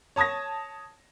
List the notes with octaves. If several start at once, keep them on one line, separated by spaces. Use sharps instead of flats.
C#5 A5 D#6 G#6 A#6